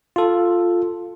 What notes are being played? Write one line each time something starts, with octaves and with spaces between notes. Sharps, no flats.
F4 A4